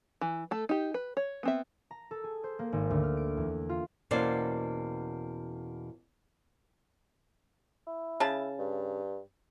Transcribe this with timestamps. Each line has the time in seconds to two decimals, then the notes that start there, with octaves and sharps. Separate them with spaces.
0.21 E3
0.51 A3 A4
0.69 D#4 G4
0.94 B4
1.17 C#5
1.43 B3 C4 E5
1.91 A#5
2.11 A4
2.24 G#4
2.44 C5
2.59 A#3
2.73 G#1
2.90 D2
3.03 F6
3.17 D7
3.37 E2
3.69 F4
4.11 E2 B2 A#3 C#4 C5 D5
7.87 E4
8.20 C#3 A5
8.59 G2